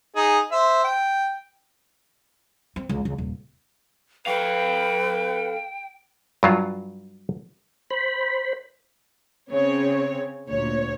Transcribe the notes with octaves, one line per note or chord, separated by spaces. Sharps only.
D#4 G#4
C5 E5
G5
C4
C#2
C#2
D#1
A4 B4 F5 G5
G2 F#3 F4
C5 B5
C#3 C4 C#5
D2 A#2 C#5